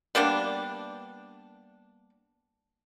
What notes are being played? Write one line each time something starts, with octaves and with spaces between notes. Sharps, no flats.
G3 A#3 B3 D4